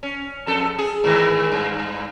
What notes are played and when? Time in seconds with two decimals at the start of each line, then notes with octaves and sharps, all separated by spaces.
0.03 C#4
0.47 F2 A4
0.79 G#4
1.04 G#2 D#3 E3
1.52 G2